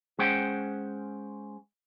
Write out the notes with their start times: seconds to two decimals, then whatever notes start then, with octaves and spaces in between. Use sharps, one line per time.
0.19 G#3 C#4 C5 F#5 G5